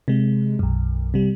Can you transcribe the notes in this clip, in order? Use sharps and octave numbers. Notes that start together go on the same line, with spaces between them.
C3 G#3
B1 F#2
C3 G3